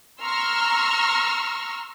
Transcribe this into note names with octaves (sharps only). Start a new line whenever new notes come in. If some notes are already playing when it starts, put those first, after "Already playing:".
A#5 C6 C#6 E6 F6